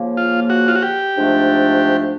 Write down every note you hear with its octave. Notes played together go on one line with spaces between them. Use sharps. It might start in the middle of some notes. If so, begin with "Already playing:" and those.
Already playing: C#3 F3 A#3
F4
F#4
F4
F#4
G4
G#2 F3 A3 D4